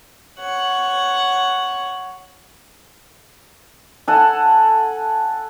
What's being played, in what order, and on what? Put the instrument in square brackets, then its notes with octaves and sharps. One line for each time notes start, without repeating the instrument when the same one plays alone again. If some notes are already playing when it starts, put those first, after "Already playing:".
[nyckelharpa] C#5 F#5
[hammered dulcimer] A4 F#5 G#5